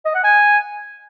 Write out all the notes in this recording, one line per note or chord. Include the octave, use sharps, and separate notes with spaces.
D#5
F#5
G#5